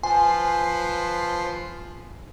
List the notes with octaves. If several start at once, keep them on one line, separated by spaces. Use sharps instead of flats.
F3 B4 C5 G#5 C6